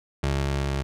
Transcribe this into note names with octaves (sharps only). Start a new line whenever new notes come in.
C#2